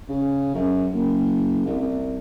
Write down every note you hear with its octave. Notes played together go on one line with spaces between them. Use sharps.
C#3
F#2
F#1
C2